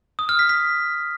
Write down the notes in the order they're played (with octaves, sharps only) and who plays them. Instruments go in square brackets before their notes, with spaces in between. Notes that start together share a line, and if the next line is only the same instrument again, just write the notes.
[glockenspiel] D#6
F6
B6
B6